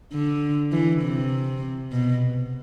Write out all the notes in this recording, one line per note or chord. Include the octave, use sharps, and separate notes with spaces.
D3
E3
C3
B2